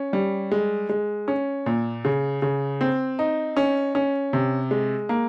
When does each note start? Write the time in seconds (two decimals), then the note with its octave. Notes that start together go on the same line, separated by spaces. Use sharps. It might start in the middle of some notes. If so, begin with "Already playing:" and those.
Already playing: C#4
0.13 G3
0.52 G#3
0.89 G#3
1.28 C#4
1.66 A#2
2.05 C#3
2.42 C#3
2.81 C4
3.19 D#4
3.57 C#4
3.95 C#4
4.33 C3
4.71 G#3
5.09 A#3